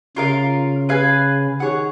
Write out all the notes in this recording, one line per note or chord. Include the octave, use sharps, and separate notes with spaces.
C#3 F4 A#4 F5
G#4 B4 F5 G#5
D#3 G#4 C#5 F#5